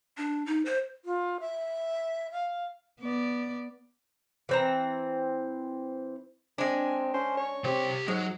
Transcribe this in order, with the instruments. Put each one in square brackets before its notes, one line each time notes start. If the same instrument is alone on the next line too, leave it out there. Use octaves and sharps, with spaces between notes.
[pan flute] D4
D#4
C5
[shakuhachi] F4
E5
F5
[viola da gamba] B3 D5
[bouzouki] E3 C4 A#5
[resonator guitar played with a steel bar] G#3 D4 [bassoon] C4 [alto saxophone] G#5
[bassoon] C#4 [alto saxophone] C5
[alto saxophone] C#5
[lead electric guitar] C2 G4 [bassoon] C4
[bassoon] G#2 [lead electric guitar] F#3 [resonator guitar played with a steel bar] G#3